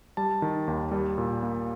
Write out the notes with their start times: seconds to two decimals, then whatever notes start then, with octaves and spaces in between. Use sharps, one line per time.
0.17 G3 A5
0.42 D#3
0.67 D#2
0.92 G3
1.18 A#2
1.43 A#3